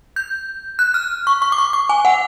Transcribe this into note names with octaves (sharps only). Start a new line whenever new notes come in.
G6
F#6
F6
C#6
C#6
D6
C#6
D6
G#5
F#5